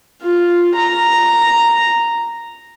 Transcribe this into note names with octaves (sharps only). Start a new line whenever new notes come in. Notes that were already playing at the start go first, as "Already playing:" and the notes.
F4
A#5